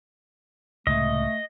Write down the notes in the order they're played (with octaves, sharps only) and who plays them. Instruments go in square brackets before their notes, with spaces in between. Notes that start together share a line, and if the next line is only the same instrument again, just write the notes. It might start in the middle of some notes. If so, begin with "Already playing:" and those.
[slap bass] C#2 A2 C3 [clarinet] A3 [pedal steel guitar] D#5